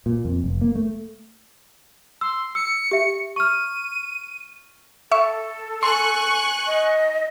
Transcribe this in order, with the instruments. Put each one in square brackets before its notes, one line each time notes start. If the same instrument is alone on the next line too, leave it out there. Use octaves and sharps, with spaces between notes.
[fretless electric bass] A#2
F2
F1
A#3
A3
[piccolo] C6 [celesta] E6
[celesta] E6 [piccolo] C#7
[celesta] G4 E5
[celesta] C#6 F6 [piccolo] D#7
[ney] A4 [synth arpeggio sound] E5 C#6
[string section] G#5 C#6 F#6 [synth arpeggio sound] C6
[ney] D#5